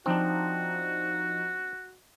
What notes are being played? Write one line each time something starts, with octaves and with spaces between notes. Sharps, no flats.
F3 C4 D4 D#4 F#4